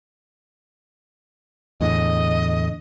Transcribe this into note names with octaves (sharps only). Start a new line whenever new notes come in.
E2 A2 D3 D#5